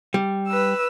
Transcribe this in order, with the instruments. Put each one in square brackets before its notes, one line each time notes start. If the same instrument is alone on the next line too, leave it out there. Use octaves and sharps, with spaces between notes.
[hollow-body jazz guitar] G3
[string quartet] B4 E6